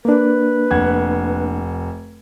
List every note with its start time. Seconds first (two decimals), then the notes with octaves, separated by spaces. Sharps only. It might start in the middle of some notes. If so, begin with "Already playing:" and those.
0.05 A#3 D4 B4
0.71 F1 F#5 G#6